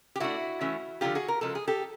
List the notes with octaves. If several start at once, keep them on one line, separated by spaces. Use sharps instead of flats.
G4
F#3 A3 D4 E4 F#4
E3 A3 C#4
D3 F3 A#3 F4 G4
F#4 G#4
A#4
C#3 F3 G#3 A4
G#4
G4 A4